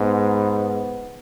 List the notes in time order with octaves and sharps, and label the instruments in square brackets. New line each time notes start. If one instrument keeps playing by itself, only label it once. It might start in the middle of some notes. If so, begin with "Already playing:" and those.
Already playing: [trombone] G#2 [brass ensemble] B3